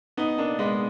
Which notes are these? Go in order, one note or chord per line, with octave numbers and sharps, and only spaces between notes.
B3 D#4
A#3 D4
G#3 B3